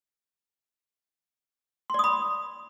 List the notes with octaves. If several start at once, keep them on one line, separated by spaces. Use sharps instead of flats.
D5 B5 C6 D#6